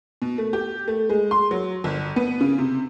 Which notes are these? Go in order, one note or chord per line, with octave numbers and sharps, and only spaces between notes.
B2
A3
G4
A3
G#3
C6
F#3
G1
B3
C#3
C3